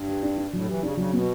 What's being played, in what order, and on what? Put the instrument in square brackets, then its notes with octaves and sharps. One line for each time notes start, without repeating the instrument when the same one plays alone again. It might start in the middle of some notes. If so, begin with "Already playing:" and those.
Already playing: [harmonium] G2
[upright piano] G4
D4
D4
[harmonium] A2 [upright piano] F#3
[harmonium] E3 [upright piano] G4
[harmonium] C#3 [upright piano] D4
[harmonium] C#3 [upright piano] F#3
[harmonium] B2 [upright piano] B3